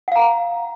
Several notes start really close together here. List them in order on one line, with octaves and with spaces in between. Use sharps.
F#5 F5 A#5